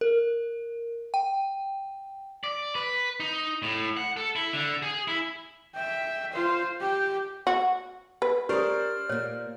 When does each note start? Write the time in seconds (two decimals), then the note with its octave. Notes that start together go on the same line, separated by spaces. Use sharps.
0.01 A#4
1.14 G5
2.44 D5
2.75 B4
3.20 D#4
3.62 A2
3.97 F#5
4.17 A4
4.36 E4
4.53 D3
4.82 G#4
5.08 E4
5.75 E5 G5
6.32 F4 C5
6.81 G4 G5
7.47 F#4
8.22 B4
8.49 C#4 G4 A#4 C5 D5 D#6 F6
9.09 A#2 A#3 C#5